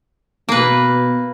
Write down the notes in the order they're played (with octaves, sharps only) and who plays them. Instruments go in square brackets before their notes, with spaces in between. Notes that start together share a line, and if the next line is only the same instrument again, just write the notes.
[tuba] B2 [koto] A#3 B4